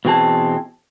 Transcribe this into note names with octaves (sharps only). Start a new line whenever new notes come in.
B2 E3 C4 G#4 A5